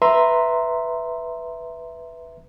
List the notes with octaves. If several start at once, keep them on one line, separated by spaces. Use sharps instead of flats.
B4 E5 A#5 C6